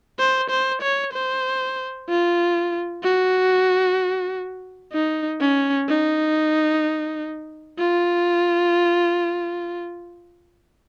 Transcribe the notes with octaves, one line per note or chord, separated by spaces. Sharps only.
C5
C5
C#5
C5
F4
F#4
D#4
C#4
D#4
F4